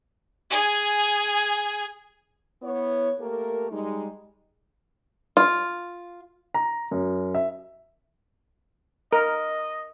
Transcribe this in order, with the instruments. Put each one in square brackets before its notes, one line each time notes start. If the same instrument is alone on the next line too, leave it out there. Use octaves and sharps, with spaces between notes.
[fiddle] G#4 G#5
[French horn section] B3 E4 C#5
A3 A#3 G4 A4 A#4
G3 G#3 D#4
[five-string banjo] F4
[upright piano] A#5
F#2
E5
[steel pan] A#4 [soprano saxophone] D#5